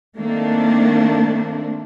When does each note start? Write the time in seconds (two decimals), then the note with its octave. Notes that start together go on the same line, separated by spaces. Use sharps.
0.18 D#3 A3 A#3 C4 D4